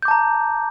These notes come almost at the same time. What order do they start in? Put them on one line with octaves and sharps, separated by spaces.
G6 D6 A5 A#5